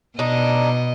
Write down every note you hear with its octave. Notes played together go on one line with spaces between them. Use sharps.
B2 D4 D#4 D#5